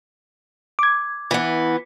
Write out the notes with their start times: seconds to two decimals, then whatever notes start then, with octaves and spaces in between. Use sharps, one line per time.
0.79 D6 G#6
1.31 E3 B3